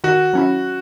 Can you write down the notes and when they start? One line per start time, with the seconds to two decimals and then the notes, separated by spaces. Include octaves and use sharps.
0.04 D#3 F#4
0.33 F#3 C#4 E4